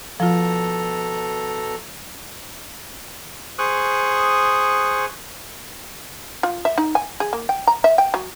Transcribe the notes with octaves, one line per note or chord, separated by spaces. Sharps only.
B2 F3 F4 A4 A#5
G#4 C5 C#6 D#6 F#6
F4
E5
D#4
G#5
G#4
A#3
G5
A#5
E5
G5
F#3